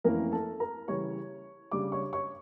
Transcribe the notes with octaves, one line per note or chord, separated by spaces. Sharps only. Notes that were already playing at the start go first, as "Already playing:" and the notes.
F2 E3 A3 A#3 C#4 E4 A#4
A4 A5
A#4 A#5
C#3 E3 G3 C#5 C#6
C#3 G3 D4 D5 D6
C#5 C#6
C#5 C#6